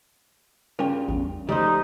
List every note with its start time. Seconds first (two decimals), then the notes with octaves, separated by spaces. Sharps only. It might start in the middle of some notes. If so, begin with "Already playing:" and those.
0.79 G2 C#3 F4 A#4 G5
1.08 A1 E2
1.49 C#3 F3 G3 A3 D#4 C5